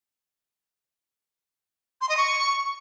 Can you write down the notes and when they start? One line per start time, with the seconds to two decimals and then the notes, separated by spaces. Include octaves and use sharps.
2.01 C6
2.09 D#5
2.17 C#6